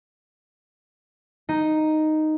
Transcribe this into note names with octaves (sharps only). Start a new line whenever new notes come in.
D#4